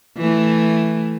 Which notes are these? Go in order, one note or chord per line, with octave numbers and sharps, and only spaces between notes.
E3 A3